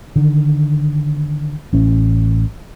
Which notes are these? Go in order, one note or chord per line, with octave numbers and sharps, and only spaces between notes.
D3 D#3
A1 C#4